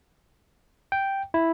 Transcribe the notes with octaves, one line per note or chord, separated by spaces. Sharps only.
G5
E4